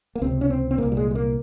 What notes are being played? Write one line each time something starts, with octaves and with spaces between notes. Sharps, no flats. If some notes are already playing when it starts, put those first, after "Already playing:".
A#3
C#2 C3 C4
C#4
C4
C4
C2 A#2 A#3
G3
G#3
G#3
A#3